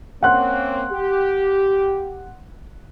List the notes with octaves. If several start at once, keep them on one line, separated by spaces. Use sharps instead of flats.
A#3 C4 C#4 F#5 C6 F#6
G4